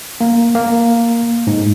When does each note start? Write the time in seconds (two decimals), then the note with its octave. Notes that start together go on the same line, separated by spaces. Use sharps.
0.21 A#3
0.55 A#3
1.47 G#2